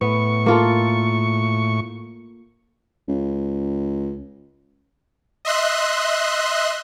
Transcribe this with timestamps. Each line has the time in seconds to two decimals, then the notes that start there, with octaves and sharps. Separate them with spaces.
0.01 A2 B3 C#6
0.46 A#3 F4 A4
3.08 C#2
5.45 D#5 E5 C6 F#6